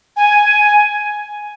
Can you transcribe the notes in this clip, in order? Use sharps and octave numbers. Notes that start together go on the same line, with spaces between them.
G#5